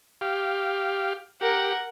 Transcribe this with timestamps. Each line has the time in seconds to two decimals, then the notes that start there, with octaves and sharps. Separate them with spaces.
0.21 G4 F5
1.41 G4 A#4 F#5